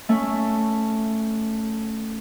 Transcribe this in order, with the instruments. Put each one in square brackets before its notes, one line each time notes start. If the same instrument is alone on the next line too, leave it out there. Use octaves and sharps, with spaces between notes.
[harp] A3 C#4 E5